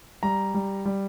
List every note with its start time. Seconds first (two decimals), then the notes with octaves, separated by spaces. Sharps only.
0.23 G3 A#5
0.54 G3
0.85 G3